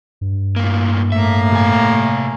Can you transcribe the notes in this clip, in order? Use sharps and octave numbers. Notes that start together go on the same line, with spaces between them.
G2
A2 A#3
A2 A#3 E5
C3 G#5